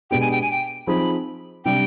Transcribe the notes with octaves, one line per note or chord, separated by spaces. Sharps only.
B2 G#3 B3 D4 G4 G5
G#5
G5
G#5
G5
F3 C4 D#4 G#4 B5
C3 G3 D4 G4 G5